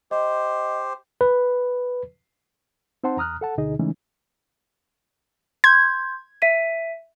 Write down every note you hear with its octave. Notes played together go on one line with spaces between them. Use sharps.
G4 C5 D#5
B4
C4 D#4 C5 F#5 A5 C6
E2 A#5 D#6 F6 F#6
A4 F#5 A5
D2 B2 D3 D#4 G#4 D#5
C#3 E3 G#3 A3 C#4 D#4
C6 G6 G#6
E5 B6 D#7